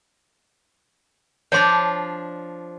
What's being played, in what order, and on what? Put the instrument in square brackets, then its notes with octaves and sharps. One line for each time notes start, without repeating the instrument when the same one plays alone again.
[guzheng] F3 D4 F4 [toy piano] C#5 C6